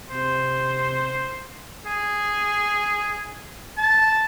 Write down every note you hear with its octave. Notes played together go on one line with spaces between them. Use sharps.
C3 C5
G#4
A5